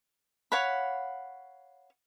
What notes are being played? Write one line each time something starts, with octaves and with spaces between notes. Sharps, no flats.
C#5 F5 F#5 B5